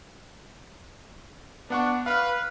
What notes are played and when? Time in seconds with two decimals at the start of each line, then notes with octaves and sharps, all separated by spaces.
1.70 B3 D4 F#5 C#6
2.06 B4 F5 F6